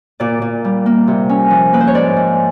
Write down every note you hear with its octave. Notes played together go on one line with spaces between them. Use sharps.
A#2 D5
A#2
G3
A#3
C3
C#4
F3
A#3 B4
C5
C#5
G#2 D5
G#2